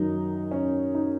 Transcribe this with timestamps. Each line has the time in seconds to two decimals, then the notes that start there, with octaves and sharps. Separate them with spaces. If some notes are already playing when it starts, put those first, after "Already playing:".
Already playing: F#2 D#3 F#3 D#4
0.51 C#4
0.95 D#4